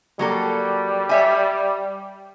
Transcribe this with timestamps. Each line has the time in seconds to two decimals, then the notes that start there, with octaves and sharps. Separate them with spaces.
0.19 F#3 G3 A#3 A4
1.09 C#5 E5 G#5